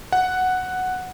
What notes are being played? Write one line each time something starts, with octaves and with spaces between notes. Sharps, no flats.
F#5